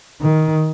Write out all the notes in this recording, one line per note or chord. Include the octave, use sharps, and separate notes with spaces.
D#3